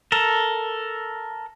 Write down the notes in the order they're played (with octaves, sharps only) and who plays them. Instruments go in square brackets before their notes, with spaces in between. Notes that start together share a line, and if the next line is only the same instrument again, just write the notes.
[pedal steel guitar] A4 A#4